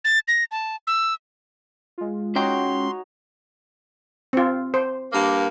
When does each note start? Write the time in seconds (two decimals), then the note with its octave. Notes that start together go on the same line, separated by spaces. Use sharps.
0.05 A6
0.28 A#6
0.51 A5
0.87 E6
1.98 G#3 F4
2.36 C#4 D#4 F#4 C#5 G5 C6
4.33 C4 F4
4.74 C5
5.13 G2 A#3